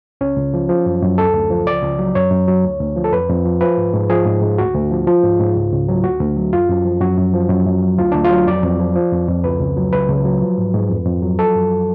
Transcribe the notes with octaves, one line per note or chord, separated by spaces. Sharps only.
C#2 C#4
C#2
F3
F3
F#2
F#2
D2 A4
D2
F3
C#2 D5
C#2
F#3
F#2 C#5
F#2
F#3
D2
D2
F3
A4
F2 B4
F2
F3
F3 B4
G#2
G#2
F3 G#4
G#2
G#2
D2 F#4
D2
F3
F3 F4
G#2
G#2
C#2
C#2
F#3
D2 F#4
D2
F#3
F#2 F4
F#2
F3
F#2 F#4
F#2
F3
F#2
F#2
F#3
D2 F4
D2 D4
F4
F#3
F2 D5
F2
F3
F3
F2
F2
C#2 B4
C#2
F#3
C#2 B4
C#2
F#3
F3
G#2
G#2
F2
F2
F#3
F3 A4
F#2